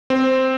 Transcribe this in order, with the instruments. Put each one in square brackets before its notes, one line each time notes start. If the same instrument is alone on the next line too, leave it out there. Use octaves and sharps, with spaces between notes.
[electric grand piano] C4